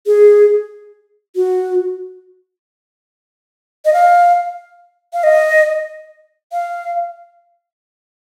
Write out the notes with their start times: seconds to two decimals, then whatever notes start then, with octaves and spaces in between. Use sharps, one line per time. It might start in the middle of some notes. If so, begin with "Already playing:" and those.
0.06 G#4
1.36 F#4
3.85 D#5
3.93 F5
5.14 F5
5.24 D#5
6.52 F5